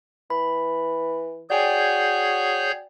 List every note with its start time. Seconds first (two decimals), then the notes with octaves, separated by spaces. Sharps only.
0.30 E3 B5
1.50 F#4 G#4 C#5 D5 G5 G#5 G6